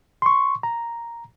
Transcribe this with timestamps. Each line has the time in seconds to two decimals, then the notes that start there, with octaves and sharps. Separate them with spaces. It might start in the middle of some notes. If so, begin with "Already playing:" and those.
0.22 C6 C#6
0.63 A#5